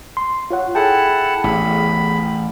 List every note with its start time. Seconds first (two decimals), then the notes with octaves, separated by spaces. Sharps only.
0.17 C6
0.51 F4 C#5 F#5
0.75 E4 G#4 A4 F#5 G5 A5
1.44 A1 E2 B5